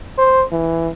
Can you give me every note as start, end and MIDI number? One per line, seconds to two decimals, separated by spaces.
0.18 0.44 72
0.52 0.89 52